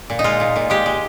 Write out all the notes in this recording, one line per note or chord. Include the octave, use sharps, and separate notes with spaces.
A#2
D#4
G#3 F4
A#2
A#2
G#3 G4
G#3